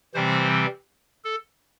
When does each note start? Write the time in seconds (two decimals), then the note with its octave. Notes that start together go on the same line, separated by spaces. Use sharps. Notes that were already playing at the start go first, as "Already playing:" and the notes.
0.14 C3 E3 G3 C4 C5
1.24 A4